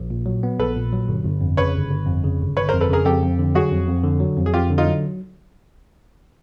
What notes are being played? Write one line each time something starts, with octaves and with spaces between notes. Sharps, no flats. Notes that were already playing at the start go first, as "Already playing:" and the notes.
Already playing: A#1
A#2
F#3
B3
A#1 A4 B4
A#2
F#3
G1
G1
F2
C#3 B4 C#5
G1
G1
F2
C#3
G1
G1 B4 C#5
F2 A#4 C5
A4 B4
C#3 G#4 A#4
F2 G4 A4
F2
D3
F#3 F#4 G#4
F2
F2
D3
F#3
F2
G#4
F2 F4 G4
D3
D#4 F4
F#3